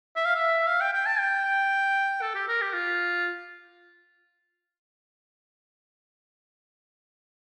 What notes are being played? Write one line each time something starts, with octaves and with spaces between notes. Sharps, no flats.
E5
F5
E5
F5
G5
G5
A5
G5
A4
G4
A#4
G4
F4